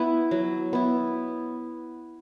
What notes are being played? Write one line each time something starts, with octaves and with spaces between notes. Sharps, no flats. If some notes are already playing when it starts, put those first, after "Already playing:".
Already playing: B3 E4
F#3
B3 E4